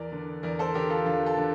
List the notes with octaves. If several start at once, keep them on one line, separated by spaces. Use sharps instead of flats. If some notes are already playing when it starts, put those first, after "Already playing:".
Already playing: E2 A#4 D5
D3
E2 A#4 D5
A4 C5
D3 G4 A#4
F4 A4
E2 D4 F4
F4 A4
D3